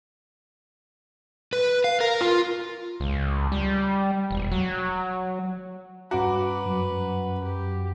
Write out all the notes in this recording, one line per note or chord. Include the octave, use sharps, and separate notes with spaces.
B4
F5
A#4
F4
C#2
G3
E1
F#3
G2 C#4 F#4 B4 A#5 D6
F#2
G4